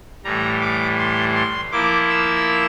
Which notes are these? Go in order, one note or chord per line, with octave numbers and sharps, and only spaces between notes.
A2 E3 G3 A#5
D6
C6
C6
F3 A#3 E4 D6
E6